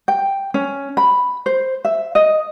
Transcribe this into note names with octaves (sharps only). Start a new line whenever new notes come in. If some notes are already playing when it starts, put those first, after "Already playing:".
G5
C#4
B5
C5
E5
D#5